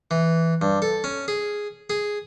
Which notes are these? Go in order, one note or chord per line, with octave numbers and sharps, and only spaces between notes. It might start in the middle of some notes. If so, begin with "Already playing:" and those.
E3
G2
A4
C#4
G#4
G#4